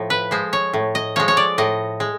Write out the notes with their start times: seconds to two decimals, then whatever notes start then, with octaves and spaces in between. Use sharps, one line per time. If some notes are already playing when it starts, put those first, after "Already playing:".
Already playing: A2 F3
0.10 B4
0.31 F3 G#3 C5
0.53 C#5
0.74 A2
0.95 D#5
1.16 F3 G#3 C#5
1.28 C#5
1.37 D5
1.58 A2 D#5
2.00 G#3